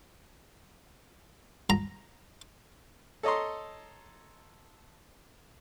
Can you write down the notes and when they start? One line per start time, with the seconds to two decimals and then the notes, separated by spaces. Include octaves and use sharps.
1.70 A#5
3.23 A4 C#5 D#5 A#5 C6